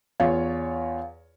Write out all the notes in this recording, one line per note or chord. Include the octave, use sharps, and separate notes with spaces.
E2 F4 C#5